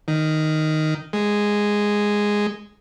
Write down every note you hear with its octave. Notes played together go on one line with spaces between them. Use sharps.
D#3
G#3